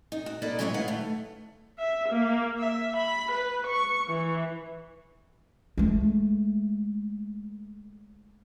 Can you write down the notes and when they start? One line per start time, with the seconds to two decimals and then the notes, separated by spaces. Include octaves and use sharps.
0.12 D#4
0.26 F#4
0.42 A#3 A4 B4 D5 D#5
0.59 A2 F#3 G#3 E4 B4 C#5
0.74 D#3 B4 F5 F#5
0.88 A3
1.79 E5
2.09 A#3
2.58 E5
2.96 B5
3.32 B4
3.67 C#6
4.08 E3
5.78 G#3 A3